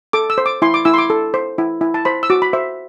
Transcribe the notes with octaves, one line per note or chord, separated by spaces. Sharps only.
A4 D6
E6
C5
D6
E4 C6
D6
E4 E6
C6
D6
A4
C5
E4
E4
A5
C5 B5
E6
F#4 D6
B5
C5 E5